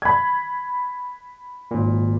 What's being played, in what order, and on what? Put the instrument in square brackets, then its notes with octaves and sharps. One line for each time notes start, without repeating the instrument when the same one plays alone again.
[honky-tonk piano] B5 G#6
[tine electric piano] G#1 A#2